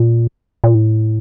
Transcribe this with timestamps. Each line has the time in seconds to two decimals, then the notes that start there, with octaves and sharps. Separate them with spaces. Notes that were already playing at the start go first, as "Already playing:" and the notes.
Already playing: A#2
0.64 A#2
0.75 A2